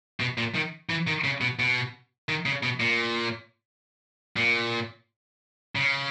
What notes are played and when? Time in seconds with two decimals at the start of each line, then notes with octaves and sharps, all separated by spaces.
0.20 B2
0.38 A#2
0.55 D#3
0.90 E3
1.07 D#3
1.24 C#3
1.41 B2
1.59 B2
2.29 D#3
2.46 C#3
2.63 B2
2.80 A#2
4.36 A#2
5.75 C#3